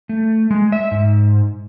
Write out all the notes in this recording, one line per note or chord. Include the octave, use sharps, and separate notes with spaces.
A3
G#3
E5
G#2